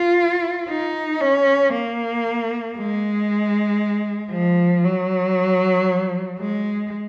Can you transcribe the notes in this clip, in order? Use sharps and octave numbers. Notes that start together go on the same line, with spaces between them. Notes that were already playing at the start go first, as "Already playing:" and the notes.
Already playing: F4
D#4
C#4
A#3
G#3
F3
F#3
G#3